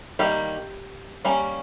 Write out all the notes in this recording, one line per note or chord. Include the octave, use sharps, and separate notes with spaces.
D#3 G3 A#3 G4
G3 A#3 C#4